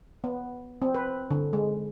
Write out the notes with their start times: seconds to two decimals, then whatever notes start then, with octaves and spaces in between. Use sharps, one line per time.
0.24 B3
0.82 C4
0.95 B4
1.31 D3
1.53 G#3